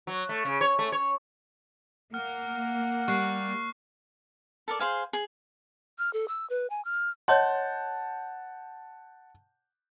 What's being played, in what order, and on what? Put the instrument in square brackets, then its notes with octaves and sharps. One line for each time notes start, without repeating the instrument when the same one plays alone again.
[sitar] F#3
A3
C#3
C#5
A3
C#5
[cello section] A#3 [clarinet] F#5 [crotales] F6
[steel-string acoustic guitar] G3 [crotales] C#6 F#6 C7
[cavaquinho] A4 A#4 D5
G#4 C5 F5 G#5
G#4
[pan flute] F6
A4
E6
B4
G#5
F6
[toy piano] C#5 D#5 C6 [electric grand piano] F#5 A5 G6